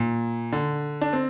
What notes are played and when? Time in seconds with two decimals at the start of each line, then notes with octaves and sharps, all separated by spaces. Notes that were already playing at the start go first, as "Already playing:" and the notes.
Already playing: A#2
0.52 D3
1.01 D4
1.13 C4